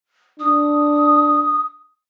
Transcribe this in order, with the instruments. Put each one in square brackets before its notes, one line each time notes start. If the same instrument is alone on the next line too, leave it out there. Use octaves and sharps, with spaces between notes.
[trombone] D4 [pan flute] D#6